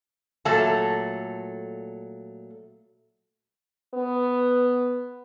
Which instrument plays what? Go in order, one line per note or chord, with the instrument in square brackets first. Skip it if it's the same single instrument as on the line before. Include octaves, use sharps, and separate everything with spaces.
[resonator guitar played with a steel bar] A#2 F#3 A3 A4 F5 A5
[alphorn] B3